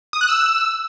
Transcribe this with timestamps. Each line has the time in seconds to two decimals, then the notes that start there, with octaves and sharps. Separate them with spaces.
0.13 D#6
0.21 F#6
0.29 E6